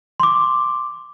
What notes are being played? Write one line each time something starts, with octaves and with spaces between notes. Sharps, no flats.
C6 D6